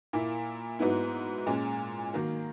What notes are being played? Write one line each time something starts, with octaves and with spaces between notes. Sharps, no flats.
A#2 A#3 E4
G#2 F#3 B3 E4
A#2 G#3 C#4
D#3 F#3 A#3